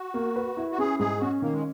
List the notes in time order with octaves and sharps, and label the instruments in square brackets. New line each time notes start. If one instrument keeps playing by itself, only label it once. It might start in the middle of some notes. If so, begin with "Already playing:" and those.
Already playing: [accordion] F#4
[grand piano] A#3
B4
E4
[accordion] F#4
[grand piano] C#4 [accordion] G#4
[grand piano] G#2 [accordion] G#4
[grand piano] C#4 [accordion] F#4
[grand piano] D#3 [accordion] A#3
[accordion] G#3